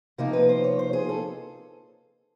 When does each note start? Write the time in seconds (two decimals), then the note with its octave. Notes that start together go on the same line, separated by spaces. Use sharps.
0.18 C3 F3 A#3 D#4 A#4
0.33 B4
0.49 C5
0.64 C#5
0.79 C5
0.93 G#4
1.09 A4